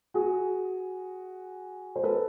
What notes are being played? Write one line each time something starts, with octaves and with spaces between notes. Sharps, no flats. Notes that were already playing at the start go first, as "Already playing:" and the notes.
F#4 G#4
C5
A4 B4